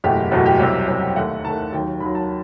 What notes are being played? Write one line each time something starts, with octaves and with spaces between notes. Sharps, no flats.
F#1 E2 B2 A3 G4
F#1 E2 B2 A3 F#4
G4
C2 C3 F#3
C2 C3 F#3
D#2 D#3 A3 F#5
D#2 D#3 A3 A5
D#2 D#3 F#3 G5
D#2 D#3 F#3 B5
A5